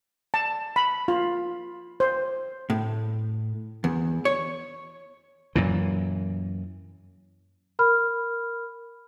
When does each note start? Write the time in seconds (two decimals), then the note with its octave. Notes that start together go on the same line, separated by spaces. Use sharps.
0.34 A5
0.76 B5
1.08 F4
2.00 C5
2.70 A2
3.84 E2
4.25 C#5
5.56 F#2 A#2 E3
7.79 A#4 B5 F6